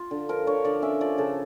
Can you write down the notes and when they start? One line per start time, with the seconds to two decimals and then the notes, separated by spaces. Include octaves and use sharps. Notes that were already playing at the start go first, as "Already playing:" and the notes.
Already playing: F4
0.11 D3
0.29 F3 A#4
0.47 D3 C#5
0.64 D3 D5
0.82 C#4 E5
1.01 F3 D5
1.18 C#3 A4